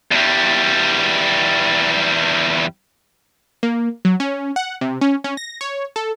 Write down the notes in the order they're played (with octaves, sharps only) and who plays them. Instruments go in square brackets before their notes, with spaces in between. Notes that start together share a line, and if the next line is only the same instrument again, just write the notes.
[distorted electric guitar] E2 G3
[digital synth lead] A#3
F#3
C#4
F#5
C3
C#4
C#4
A#6
C#5
A4